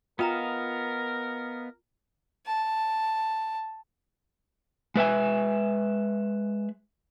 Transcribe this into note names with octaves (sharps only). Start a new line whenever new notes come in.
B3 F4 A#4 D#5 F5 G5 A#5
A5
G#3 B4 E5 G#5